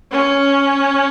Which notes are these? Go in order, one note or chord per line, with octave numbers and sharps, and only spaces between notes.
C#4